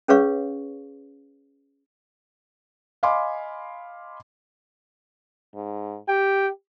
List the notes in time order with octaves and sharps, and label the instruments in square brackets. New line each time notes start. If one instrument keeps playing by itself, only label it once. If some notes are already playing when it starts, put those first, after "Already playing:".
[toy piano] C#4 G#4 B4 C#5 F5 C#6
[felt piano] D#5 F5 G#5 B5 C6 D6
[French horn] G#2
[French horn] G4 [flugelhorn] G5